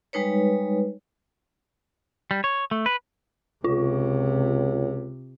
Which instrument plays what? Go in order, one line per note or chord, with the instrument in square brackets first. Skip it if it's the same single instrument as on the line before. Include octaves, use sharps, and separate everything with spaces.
[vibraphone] G3 G#3 D#4 B4 C#5
[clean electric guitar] G3
C#5
A3
B4
[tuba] C#2 [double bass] C3 [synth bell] F4